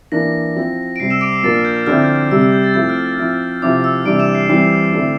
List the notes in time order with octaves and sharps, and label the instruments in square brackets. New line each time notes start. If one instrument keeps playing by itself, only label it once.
[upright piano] E3 A#3 D4 [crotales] A#6
[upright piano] F3 C4 E4
[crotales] D7
[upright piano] C3 G3 C4 [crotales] C7
[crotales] E6 E7
D6 D7
C7
[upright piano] A#2 F3 A#3 D4 [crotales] A6
[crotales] F6
G6
F6
[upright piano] D3 F3 C4 E4 [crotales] F6
[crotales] G6
F6
[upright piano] C3 G3 C4 [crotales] E6
[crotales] E6
G6
A6
[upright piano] F3 A3 C4 E4 [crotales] G6
[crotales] F6
[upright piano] F3 C4 E4
[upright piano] C3 F3 C4 E4 [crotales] D6
[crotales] E6
[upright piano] C3 E3 G3 D4 [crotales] D6 D7
[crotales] E6 E7
C7
[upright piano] E3 G3 C4 [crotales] C7
[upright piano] D3 A3 C4 E4